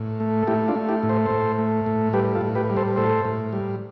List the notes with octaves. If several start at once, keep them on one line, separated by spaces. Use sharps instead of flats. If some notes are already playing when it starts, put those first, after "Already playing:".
Already playing: A2
A3
A4
A3 E4 G4
D4 F4
A3
E4 G4
A2
C5
A2 A4 C5
A3
A2
G3 G4 B4
F4 A4
A2
G4 B4
G3
A4 C5
A2 A4 C5
A2
G3